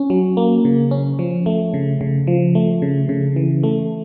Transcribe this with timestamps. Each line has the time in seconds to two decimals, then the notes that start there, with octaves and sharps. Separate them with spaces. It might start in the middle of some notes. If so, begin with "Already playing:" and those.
Already playing: C#4
0.10 F#3
0.37 A#3
0.65 C#3
0.91 C#4
1.19 F3
1.46 A3
1.74 C#3
2.01 C#3
2.27 F3
2.55 A3
2.82 C#3
3.09 C#3
3.36 E3
3.63 A3